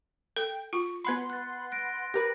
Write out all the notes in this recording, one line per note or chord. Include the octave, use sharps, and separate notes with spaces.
A4 G5
F4 C#6
B3 B4 F#5 B5 C6
F#6 A6
F#6 A#6 D7
G4 A#4 B4 A#6